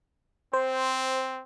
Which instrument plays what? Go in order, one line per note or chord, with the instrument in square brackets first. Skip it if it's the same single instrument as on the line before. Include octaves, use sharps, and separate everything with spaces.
[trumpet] C4 [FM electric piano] C5